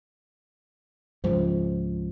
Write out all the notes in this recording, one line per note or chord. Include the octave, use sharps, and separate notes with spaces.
C#2 G#2 C#3 F3 C5